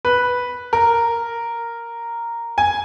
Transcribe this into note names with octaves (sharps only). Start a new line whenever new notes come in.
B4
A#4
G#5